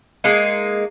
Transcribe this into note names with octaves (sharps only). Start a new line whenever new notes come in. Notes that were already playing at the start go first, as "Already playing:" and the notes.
G#3 A#3 D#4